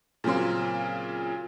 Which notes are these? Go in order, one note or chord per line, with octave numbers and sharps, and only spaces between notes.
A#2 C#3 F#3 C4 C6